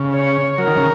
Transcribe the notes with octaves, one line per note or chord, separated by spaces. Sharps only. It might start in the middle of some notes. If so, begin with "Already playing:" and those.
Already playing: C#3
C#5
F#3 A#4
D#3
C#3